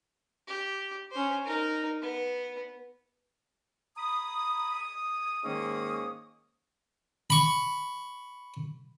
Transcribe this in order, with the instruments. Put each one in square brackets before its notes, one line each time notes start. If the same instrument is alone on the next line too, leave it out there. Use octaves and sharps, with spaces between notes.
[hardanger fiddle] G4
C#4 C5
D#4 A#4
B3
[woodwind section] A#5 B5 D#6
D#6
G#2 D#3 A#3 C#4 D#6
[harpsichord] B5 C#6